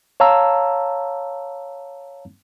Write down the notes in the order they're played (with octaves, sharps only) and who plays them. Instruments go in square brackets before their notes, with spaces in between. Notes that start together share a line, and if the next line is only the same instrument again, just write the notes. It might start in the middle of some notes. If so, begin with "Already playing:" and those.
[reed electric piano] C#5 F5 A5 A#5 E6